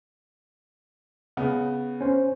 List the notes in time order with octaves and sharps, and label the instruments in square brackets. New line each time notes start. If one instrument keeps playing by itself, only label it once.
[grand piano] C#3 B3
[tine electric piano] C#4 C5